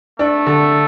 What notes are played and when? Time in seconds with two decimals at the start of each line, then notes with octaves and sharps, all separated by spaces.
0.19 A3 D4
0.47 D3